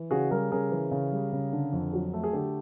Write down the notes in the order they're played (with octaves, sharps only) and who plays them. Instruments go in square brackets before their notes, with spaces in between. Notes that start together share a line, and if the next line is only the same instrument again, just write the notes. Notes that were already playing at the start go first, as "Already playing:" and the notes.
Already playing: [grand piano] E3
C#3 F#4 G#4
G3 G#4 A#4
C#3 G#4 A#4
E3
C#3
G3
C#3
D3
F2
F#3
A3
G#4
D3 G4 A4